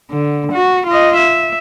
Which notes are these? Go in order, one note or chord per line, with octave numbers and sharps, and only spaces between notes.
D3
F#4
F4 D#5
E5